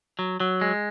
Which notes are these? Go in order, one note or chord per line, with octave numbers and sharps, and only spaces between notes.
F#3
F#3
G#3